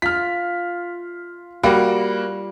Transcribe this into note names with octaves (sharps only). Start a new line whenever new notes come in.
F4 F6 B6
G3 A#3 F#4 F5 B5